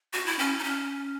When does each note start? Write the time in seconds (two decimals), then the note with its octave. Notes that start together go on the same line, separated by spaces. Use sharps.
0.13 F#4
0.26 E4
0.39 C#4
0.59 D#4
0.64 C#4